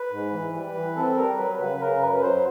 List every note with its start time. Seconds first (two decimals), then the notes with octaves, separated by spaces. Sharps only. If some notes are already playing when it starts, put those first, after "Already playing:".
Already playing: B4
0.11 G#2
0.32 E3
0.53 G3
0.75 E3
0.96 C4 A4
1.16 G3 A#4
1.37 F#3 B4
1.59 C#3 B4
1.80 C#3 A#4
2.01 F#2 B4
2.12 B4
2.22 F#3 C5